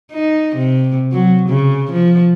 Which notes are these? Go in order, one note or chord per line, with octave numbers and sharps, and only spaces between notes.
D#4
C3
F#3
C#3
F3